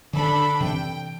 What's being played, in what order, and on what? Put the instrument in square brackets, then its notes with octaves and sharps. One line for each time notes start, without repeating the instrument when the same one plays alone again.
[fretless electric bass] D3 [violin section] D4 A4 B5
[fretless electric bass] C3 E3 C4 [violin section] G5